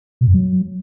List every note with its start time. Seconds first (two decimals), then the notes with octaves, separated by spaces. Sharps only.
0.21 B2
0.27 F#2
0.34 F#3